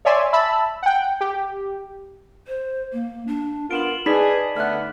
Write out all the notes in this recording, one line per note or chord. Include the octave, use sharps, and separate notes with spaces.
C#5 D5 E5 G#5 C6
E5 A5 B5 E6
F#5 G5
G4
C5
A#3
D4
B3 F4 A#4 D7 E7 F#7
D#4 G#4 B4 D5 B5 B6
D3 A3 B3 E5 F6 F#6